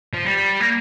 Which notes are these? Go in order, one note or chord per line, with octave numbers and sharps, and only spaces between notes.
F3
G3
A#3